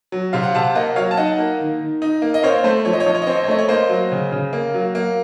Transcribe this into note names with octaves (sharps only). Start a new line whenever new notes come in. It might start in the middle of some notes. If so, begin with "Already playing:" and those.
F#3
C3 F5
F#5
C3 F5 A5
A#3 D#5 F#5
F#3 C#5 F5
A5
D#4 D#5 F#5
A#3
D#3
D#3
D#4
A#3
D#5
C4 C#5 F5
A3 C5
F3 C#5
D#5
C#5
F3 D#5
C#5
D#5
C4 C#5
D#5
C#5
A3 D#5
C#5
A#3 C5 D#5
F#3
C#3
C#3
A#3
F#3
A#3